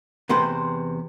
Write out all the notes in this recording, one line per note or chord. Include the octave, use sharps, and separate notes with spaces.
E2 C3 B4 C5